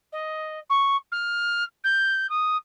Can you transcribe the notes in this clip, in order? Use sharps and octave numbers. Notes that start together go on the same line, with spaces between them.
D#5
C#6
F6
G6
D#6